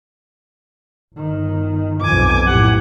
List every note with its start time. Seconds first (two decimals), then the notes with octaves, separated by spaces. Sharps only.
1.14 G1 D#3
2.01 B1 F2 G#5 D6
2.47 F#2 A2 G4 F#5